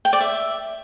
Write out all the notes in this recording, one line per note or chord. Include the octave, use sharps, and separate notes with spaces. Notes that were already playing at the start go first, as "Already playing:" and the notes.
G5
D5
E5